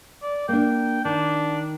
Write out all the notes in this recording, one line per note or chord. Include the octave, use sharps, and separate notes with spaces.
D5
A#3 D4 G5
D#3 D4